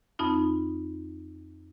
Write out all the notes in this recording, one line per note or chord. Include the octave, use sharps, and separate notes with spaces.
F2 C4 D#4 F4 B5